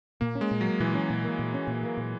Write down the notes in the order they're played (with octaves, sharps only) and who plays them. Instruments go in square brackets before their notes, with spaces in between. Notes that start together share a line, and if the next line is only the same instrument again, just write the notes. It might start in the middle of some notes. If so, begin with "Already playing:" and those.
[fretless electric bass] A#2 [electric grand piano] A#3
[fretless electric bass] C#4
[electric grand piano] G#3
[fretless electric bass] A#2
[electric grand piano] F#3 [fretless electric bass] A#3
[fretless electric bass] A#2 [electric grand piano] E3
[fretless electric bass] C#4
A#2
A#3
A#2
C#4
A#2
A#3
A#2